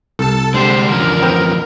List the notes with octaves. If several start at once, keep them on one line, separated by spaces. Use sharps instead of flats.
C2 A4 A5
D3 G#3 G4 C5
E3 F3 C#4 A#4
B3 C4 G5